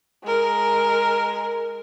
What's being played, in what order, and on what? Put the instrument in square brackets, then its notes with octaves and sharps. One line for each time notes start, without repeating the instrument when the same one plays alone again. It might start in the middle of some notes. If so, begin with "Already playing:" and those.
[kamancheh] G#3 A#4